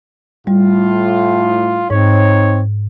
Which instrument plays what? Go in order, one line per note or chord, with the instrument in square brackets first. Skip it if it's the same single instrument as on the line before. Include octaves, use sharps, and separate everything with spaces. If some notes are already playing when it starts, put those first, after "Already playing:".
[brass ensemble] A2 F4 [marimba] G3
[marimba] G#2 [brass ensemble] C4 D#4 C#5